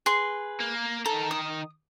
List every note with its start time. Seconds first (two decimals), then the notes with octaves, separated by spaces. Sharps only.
0.06 G#4 B4 C6
0.60 A#3
1.06 D#3 A4 A#5
1.31 D#6